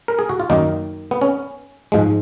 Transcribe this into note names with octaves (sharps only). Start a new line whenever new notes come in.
A#4
G#4
F#4
F4
F#2 D#3 A#3 D#4
B3
C#4
G#2 F3 G#3